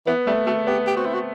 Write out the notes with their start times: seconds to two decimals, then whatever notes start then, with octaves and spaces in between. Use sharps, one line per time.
0.07 E3 B3
0.26 G3 A3
0.46 A3 F#4
0.67 B3 G4
0.87 G4
0.97 C4 F#4
1.06 E4
1.14 F#4